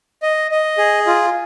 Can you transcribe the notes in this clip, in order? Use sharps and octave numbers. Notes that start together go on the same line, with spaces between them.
D#5
D#5
G#4
F4